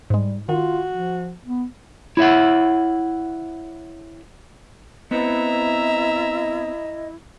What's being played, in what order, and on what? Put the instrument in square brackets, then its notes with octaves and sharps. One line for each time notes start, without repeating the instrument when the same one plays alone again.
[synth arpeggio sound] G#2 G#3 [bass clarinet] G3
[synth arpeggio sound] D#3 [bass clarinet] F4 [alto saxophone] F#4
[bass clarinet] F3
B3
[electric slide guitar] E4 C#5 E5 F#5
[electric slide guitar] B3 C4 B4 [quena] E4 [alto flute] D#5 [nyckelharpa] E5 A#5